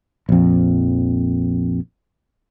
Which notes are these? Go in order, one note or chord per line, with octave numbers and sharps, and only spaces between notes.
A#1 F2